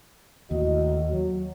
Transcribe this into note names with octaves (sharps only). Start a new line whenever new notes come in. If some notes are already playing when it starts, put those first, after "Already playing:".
D#2 A2 F#4 D#5
F#3